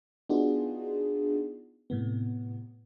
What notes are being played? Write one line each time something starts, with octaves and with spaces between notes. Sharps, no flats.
B3 D4 D#4 F4 F#4 G#4
A2 C3 B3